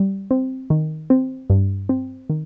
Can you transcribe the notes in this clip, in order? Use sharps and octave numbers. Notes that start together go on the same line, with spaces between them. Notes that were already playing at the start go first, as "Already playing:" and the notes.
Already playing: G3
C4
D#3
C4
G2
C4
D#3